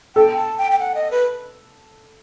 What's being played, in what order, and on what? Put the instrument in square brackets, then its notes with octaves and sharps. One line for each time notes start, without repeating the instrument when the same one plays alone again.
[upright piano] A4 [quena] G5
[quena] A5
G5
G5
F#5
D#5
B4